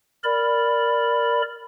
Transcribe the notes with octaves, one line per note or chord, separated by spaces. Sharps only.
A#4 D5 B5